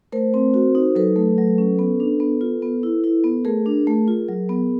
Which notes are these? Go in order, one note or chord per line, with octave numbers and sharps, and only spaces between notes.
A3 A#4 C5
C4
F#4
D#4
F#3 A4 B4
A3
F#3
C#4
B3
D4
B3
F4
B3
E4
E4
B3
A3 G#4 A#4
D4
A3
F4
F#3
B3